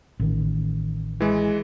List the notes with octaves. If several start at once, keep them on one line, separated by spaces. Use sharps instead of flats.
A1 D#3
E3 G#3